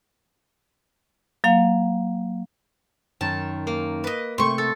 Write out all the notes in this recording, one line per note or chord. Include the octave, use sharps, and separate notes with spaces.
F#3 A#3 F5
F#2 D#3 C#4 A5
A#3
B4 D#5
C3 A3 C6 C#6
A4